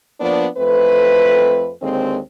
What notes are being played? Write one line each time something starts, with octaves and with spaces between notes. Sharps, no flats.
F3 A#3 B3 D4
F2 A3 C4 B4
D#2 D3 G#3 C4